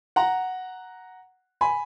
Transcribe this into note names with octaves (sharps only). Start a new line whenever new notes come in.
F#5 A#5
G#5 B5